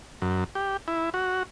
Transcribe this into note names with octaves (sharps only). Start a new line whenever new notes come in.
F#2
G4
E4
F#4